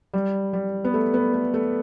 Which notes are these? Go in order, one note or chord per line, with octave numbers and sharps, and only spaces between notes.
G3
G3
B3
A3
B3
A3
A3